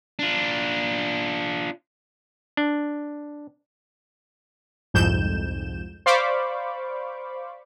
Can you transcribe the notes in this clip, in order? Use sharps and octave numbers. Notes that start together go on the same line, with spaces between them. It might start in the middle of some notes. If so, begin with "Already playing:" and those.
D4 F4
D4
C2 F2 G#2 G6 E7
C5 D5 F5 B5 C#6 D6